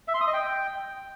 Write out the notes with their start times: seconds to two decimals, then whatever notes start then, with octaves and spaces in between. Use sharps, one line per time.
0.08 E5
0.14 C6
0.21 D#6
0.27 D#5
0.34 G5